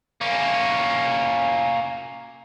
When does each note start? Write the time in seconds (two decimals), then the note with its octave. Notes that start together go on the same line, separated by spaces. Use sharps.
0.21 A#3 C#4